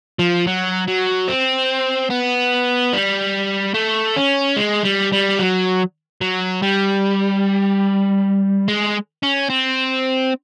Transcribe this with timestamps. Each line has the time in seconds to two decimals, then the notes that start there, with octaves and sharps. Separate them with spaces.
0.19 F3
0.47 F#3
0.87 F#3
1.28 C4
2.10 B3
2.93 G3
3.74 A3
4.16 C#4
4.56 G#3
4.84 G3
5.12 G3
5.39 F#3
6.21 F#3
6.62 G3
8.68 G#3
9.23 C#4
9.50 C4